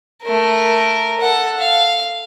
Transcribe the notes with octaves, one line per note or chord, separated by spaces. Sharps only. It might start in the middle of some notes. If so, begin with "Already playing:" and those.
A3 A#4
A4 F#5
F5